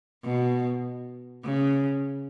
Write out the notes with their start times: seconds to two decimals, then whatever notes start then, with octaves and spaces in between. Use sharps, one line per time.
0.24 B2
1.45 C#3